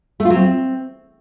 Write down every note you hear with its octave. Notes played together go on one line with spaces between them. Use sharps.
A3
F4
F#3
C4